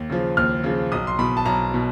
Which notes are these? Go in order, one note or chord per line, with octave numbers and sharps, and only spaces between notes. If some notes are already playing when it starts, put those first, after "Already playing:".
Already playing: D#2
C#3 F3
D#2 F6
C#3 F3
B1 D#6
C6
B2 B5
A5
B1 A#5
B2